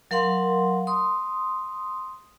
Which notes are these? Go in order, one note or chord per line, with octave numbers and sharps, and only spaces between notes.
F#3 A#4 F5 F#5 C6
C6 D#6